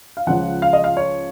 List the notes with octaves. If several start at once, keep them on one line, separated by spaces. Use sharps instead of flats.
F5
C#2 C#3 F3 F#5
F5
D#5
F5
C#5